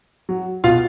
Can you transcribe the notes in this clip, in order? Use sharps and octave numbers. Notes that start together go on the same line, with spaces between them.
F#3
B2 F4 F5